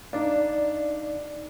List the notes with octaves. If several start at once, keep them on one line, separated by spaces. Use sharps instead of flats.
D4 D#4 D5 F5